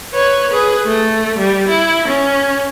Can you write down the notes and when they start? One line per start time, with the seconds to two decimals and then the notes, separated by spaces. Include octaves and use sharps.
0.13 B4 C#5
0.51 G#4 B4
0.86 A3
1.38 G3
1.69 E4
2.08 C#4